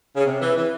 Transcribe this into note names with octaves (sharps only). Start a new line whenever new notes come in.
C#3
C3
E3
E3